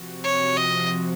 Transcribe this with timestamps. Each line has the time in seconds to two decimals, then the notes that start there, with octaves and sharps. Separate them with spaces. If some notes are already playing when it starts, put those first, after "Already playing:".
Already playing: C3 F3 C4 F#4
0.24 C#5
0.57 D#5